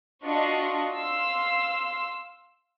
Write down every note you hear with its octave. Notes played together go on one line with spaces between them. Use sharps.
D4 F4 F#4 D#5 F#5 C#6
F5 C6 E6